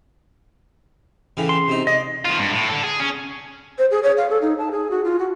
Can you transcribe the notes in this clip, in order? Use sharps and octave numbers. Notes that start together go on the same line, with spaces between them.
A2 C#3 E3
C6
C3 D#4
D5 D#5 D#6
D#3 F4
G2
A2
D3 A4
G#4
C#4
C5
G#4
C#5
F5
A4
D#4
A5
G#4
F#4
F4
F#4